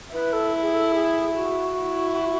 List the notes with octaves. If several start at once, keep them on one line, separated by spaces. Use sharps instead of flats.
E4 B4
A4
G#4
A4
G#4
F#4
E4